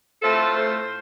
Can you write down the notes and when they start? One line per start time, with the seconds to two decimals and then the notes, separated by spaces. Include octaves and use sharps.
0.22 A2 A3 C4 F4 A4
0.57 C5